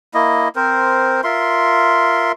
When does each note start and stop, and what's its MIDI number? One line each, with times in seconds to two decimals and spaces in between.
0.14 0.48 58
0.14 0.48 64
0.14 0.48 75
0.56 1.21 60
0.56 1.21 70
0.56 1.21 72
1.24 2.32 65
1.24 2.32 70
1.24 2.32 76
1.24 2.32 84